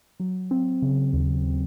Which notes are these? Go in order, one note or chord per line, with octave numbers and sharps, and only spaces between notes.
F#3
C4
C#3
D#2